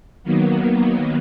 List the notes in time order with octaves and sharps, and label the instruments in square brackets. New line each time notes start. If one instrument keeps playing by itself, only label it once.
[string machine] D#3 F#3 A#3 B3